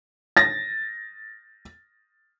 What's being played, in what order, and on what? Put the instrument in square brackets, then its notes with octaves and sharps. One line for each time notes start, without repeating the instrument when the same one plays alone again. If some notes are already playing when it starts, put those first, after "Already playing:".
[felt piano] A6 A#6